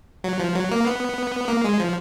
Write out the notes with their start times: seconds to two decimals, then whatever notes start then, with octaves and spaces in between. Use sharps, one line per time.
0.24 F#3
0.40 F3
0.55 F#3
0.71 A#3
0.86 B3
1.48 A#3
1.64 G#3
1.80 F3